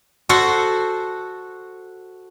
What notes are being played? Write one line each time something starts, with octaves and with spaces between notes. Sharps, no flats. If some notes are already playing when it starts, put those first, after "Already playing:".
F#4 A4 C5 F#5